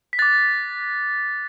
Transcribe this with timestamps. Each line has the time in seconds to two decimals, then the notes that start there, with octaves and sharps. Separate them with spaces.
0.13 B6
0.19 D6 F#6 A6